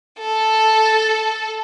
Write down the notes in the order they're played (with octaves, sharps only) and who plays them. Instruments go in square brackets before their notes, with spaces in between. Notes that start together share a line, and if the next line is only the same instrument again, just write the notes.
[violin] A4